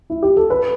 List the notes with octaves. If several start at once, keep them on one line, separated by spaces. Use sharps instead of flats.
E4
G4
A4
B4